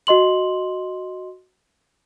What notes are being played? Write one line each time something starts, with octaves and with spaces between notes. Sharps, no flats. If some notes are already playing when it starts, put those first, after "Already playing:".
F#4 D#5 C6 F#7